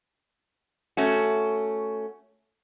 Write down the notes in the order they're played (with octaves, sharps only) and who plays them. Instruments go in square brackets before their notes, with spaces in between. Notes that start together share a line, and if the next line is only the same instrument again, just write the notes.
[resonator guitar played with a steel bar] A3 C#4 F#4